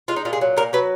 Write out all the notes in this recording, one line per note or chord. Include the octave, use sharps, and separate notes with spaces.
G#3 F4
D#4
A#2 F4
G#4
F#3
A#2 A#4
F#3 B4